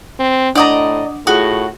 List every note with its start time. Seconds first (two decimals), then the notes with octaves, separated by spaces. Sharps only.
0.19 C4
0.55 A2 D4 D5 D#5 F#5 A#5 D6
1.27 A2 F4 F#4 G#4 D#6